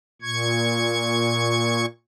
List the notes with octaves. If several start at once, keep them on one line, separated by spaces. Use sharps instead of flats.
A#2 C#6 G#6